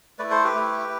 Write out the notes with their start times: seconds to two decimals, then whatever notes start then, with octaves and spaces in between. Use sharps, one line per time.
0.19 A3 E4 B4 D5
0.31 A4 C5
0.44 G4 B4
0.55 A3 E4